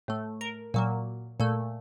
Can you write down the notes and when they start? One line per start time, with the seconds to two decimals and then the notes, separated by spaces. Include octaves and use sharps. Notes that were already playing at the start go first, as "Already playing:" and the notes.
0.08 A2 A3
0.41 A#4
0.74 A#2 F#3 A#3
1.40 A#2 A3